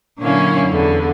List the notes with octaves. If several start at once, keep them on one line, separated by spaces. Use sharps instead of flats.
A#2 D3 F#3 C#4 E4 F5
E2 D3